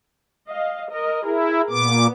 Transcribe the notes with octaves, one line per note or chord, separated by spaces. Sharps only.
D#5 F5
A#4 D#5
E4 G#4 A#4
A#2 B3 D6